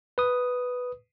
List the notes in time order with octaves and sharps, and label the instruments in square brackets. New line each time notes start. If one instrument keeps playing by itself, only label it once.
[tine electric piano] B4 D#6